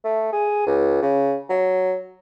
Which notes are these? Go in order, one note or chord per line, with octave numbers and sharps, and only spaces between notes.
A3
G#4
C#2
C#3
F#3